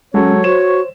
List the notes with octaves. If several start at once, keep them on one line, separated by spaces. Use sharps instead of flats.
F#3 G#3 C#4 F#4 A4 C#5
F#4 C5 E7